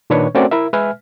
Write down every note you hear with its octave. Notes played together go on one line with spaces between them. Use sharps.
A#2 D#3 D4 B4 C#5 C#6
A3 C4 C#4 F#4 A#4 D5
E4 A#4 E5
G#3 B4 E5 G#5 F6